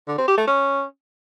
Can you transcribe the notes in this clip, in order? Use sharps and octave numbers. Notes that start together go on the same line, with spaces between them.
D3
C4
G4
A3
C#4